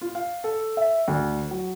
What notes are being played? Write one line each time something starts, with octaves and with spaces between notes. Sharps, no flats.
F4
F5
A4
E5
D2
F#3